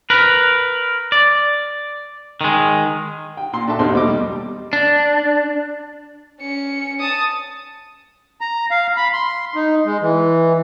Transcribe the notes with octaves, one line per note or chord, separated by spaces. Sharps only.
A#4 B4
D5
D#3 G#3
G5
A#2 C6
D4 F#4 A4 E5 A5
A1 E2 A3 D#4 C5 C6
D#2 B2 D#4 D6
G3
D4
C#4 C#7
A5 D#6
A#5
F5
B5
C6
D#4
G#3
E3